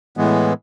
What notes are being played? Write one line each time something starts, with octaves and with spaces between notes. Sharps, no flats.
A2 E3 G#3 B3